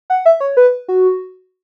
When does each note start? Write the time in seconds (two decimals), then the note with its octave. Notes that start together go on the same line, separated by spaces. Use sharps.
0.10 F#5
0.26 E5
0.40 C#5
0.57 B4
0.88 F#4